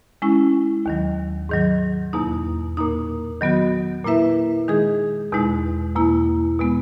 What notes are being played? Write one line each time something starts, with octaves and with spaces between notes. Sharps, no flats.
G#3 C#4 E4
D#2 D#3 F#3
G#2 D#3 F#3
E2 B2 A#3 D#4
A#2 A#3 D#4
D#3 F#3 B3 F#4
A#2 A#3 E4 B4 E5
D#3 G#3 D#4 G#4
E2 B2 G#3 D#4
E2 B2 A#3 E4
B2 G#3 B3